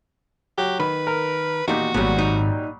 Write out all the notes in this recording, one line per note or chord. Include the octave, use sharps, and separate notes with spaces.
F#3 G4
D#3 B4 B5
A#4
E2 A#2 D#3 D#4 F#4 G4
G#1 A#2 F#3 G3 B3 C#4
D#4